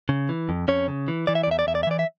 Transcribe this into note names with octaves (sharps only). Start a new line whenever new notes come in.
C#3
E3
F2
F2 C#4 C#5
C#3
E3
E3 D5
E5
D5
E2 E5
D5
E2 E5
D5
E5
E3 D5
E5